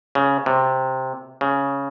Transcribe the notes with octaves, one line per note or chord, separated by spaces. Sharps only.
C#3
C3
C#3